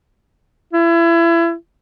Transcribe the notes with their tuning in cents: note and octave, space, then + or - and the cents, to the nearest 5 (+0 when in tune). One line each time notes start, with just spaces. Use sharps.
E4 +30